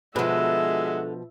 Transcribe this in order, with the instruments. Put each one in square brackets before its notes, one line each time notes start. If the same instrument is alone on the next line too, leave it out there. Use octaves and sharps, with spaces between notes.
[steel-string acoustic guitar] B2 F3 [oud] D3 B4 [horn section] G#3 F#4 [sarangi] E5